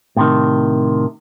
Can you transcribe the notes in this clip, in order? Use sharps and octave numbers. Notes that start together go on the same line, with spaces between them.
A2 C3 D#3